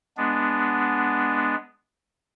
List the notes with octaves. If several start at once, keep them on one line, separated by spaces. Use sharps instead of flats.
G#3 B3 D4